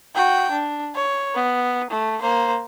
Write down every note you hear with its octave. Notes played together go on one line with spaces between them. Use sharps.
F#4 G5
D4
C#5
B3
A3
A#3 C5